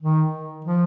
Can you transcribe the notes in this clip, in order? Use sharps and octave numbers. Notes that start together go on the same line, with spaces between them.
D#3
F3